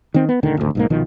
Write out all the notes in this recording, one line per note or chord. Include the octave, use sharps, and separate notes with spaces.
D#3 C4
B3
D#1 D2 D3 D#3
G#1 D2
B1 G#2 A#3
C2 B2 D#3 F3